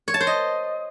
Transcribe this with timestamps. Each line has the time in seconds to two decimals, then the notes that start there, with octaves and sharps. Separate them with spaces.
0.08 C#5
0.14 A5
0.20 C5
0.27 D#5